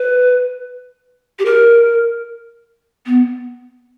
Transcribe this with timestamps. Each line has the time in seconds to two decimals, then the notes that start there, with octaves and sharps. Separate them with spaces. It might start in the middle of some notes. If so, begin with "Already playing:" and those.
Already playing: B4
1.39 G4
1.45 A#4
3.06 B3